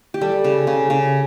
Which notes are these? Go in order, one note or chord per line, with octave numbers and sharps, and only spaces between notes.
G4
G3 A4
C#3
C#3
C#3